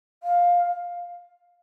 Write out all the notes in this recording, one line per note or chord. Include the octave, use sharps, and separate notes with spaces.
F5